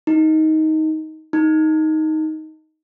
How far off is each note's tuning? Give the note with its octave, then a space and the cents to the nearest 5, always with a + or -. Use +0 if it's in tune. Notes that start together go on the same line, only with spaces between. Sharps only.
D#4 +15
D#4 +10